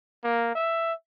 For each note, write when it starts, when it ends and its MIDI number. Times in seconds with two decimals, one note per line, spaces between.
0.24 0.53 58
0.56 0.93 76